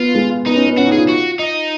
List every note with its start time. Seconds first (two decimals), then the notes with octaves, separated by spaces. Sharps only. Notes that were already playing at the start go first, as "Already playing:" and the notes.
Already playing: B3 F4
0.15 G#3
0.46 B3 D#4
0.56 C#4
0.66 B3
0.78 C#4 F#4
0.87 D#4
0.92 G#4
0.97 F4
1.09 F#4
1.39 D#4